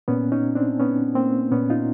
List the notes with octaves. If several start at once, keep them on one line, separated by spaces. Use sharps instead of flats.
A#2 B3 C#4
C#4 D#4
C4 D4
B3 C#4
A#3 C4
A#2 B3 C#4
D#4 F4